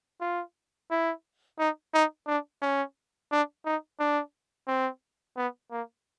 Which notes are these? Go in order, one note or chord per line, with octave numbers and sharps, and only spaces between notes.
F4
E4
D#4
D#4
D4
C#4
D4
D#4
D4
C4
B3
A#3